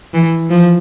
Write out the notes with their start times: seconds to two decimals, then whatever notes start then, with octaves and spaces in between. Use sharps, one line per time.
0.14 E3
0.50 F3